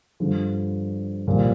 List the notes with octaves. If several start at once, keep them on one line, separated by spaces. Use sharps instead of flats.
G2 D3 F3
C2 A#2 F3